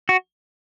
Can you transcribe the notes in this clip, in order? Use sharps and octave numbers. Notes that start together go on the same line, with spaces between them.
F#4